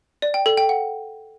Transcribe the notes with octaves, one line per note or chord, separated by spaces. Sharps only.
D5
G5
A4
G5
F#5